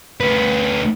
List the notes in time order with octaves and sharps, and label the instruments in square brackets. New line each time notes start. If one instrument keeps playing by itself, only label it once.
[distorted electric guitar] D2 B4